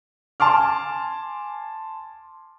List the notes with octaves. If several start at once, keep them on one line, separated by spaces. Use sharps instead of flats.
G#5 A5 C6 D6 F6